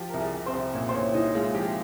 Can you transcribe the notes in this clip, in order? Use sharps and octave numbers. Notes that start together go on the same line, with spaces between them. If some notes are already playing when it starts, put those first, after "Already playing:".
Already playing: F3 G4
C2 A#4
G#4
C2
C4 C5
C2
A#2 C#4 C#5
C5
A#2 C#4 C#5
C2 D#4 D#5
G#3 F4 F5
F3 G4 G5